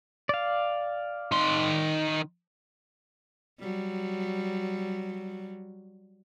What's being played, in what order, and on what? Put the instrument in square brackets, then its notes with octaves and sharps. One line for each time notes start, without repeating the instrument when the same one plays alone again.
[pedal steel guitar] D5 F5
[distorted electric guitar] D#3 C6
[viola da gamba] F#3 G3